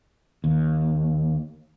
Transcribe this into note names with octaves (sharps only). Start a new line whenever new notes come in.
D#2